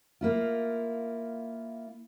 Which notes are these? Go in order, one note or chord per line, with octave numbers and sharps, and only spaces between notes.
A#3 E4 F4